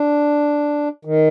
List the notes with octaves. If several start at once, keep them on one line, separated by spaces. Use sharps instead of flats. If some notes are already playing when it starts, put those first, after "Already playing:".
Already playing: D4
D#3